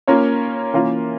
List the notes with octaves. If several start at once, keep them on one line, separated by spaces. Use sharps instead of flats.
A#3 C#4 F4 A#4 C#5
E3 A#3 C#4 F4 A#4